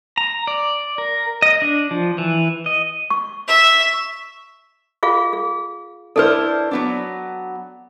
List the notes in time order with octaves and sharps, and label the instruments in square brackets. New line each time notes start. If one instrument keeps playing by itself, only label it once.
[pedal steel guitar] A#5
D5
A#4
D#5
D4
F3
E3
D#5
[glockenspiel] C#6
[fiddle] E5
[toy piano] F4 G#4 F5
G#4
[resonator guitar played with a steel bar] D4 E4 C5 [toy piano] A4 B4
[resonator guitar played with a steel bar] F#3 B3 D4